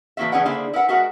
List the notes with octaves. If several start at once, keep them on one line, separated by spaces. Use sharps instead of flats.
A2 E3 F#3 A#3 F#4 E5
E3 A3 C#4 G#4 D5 F#5
D3 A#3 E4 G#4 C5
E4 A#4 B4 F#5
G#3 F#4 A#4 E5 F#5